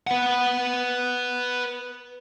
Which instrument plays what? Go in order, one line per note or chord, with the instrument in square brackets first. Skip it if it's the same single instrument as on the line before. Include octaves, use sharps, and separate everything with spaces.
[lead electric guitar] B4 F#5